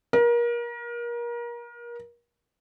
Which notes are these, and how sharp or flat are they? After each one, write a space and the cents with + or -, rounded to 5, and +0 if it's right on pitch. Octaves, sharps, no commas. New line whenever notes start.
A#4 +30